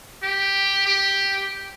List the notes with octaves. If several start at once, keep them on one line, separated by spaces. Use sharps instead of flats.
G4
G4